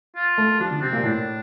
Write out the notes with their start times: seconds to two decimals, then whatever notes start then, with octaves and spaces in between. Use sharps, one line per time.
0.16 F4
0.38 A3
0.60 F3 D4
0.70 D3
0.82 C3 C4
0.93 A#2
1.04 A2 D4